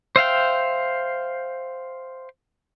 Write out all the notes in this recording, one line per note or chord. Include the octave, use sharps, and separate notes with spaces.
C5 E5 F5 G5